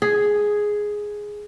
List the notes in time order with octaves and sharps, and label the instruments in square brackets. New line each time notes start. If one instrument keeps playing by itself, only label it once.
[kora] G#4